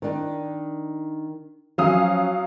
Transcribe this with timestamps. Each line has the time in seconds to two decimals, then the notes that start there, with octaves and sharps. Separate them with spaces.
0.02 D#3 D4
1.78 F3 F#3 C#4 E5 F5 D#6